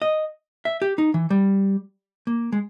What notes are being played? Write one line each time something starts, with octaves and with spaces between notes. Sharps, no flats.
D#5
E5
G4
D#4
E3
G3
A#3
G#3